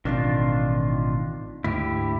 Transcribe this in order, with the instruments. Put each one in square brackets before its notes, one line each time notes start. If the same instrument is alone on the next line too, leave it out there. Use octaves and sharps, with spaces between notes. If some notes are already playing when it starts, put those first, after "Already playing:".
[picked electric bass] A1 B2 C4 [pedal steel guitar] D#3 D4 F4
[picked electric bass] D2 G#2 [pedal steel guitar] E4 G4